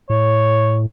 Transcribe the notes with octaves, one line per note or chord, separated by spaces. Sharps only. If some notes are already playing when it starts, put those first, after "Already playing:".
A2 C#5